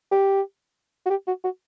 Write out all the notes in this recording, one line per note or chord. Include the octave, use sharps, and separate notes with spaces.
G4
F#4
G4
F#4
F#4